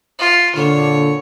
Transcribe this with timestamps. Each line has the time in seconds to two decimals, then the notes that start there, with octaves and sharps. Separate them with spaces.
0.19 F4
0.55 A#2 D3 C#5